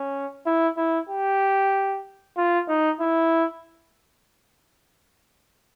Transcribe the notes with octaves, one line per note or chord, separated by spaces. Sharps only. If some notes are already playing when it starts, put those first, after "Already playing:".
Already playing: C#4
E4
E4
G4
F4
D#4
E4